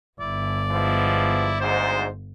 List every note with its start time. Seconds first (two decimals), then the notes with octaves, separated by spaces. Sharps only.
0.20 G1 E4 D5
0.70 F3 G#3 B3 E4
1.60 D2 G#2 C5